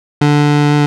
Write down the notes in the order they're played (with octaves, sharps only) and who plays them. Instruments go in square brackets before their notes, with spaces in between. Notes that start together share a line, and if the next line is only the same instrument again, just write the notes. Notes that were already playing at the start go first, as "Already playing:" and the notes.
[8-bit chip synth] D3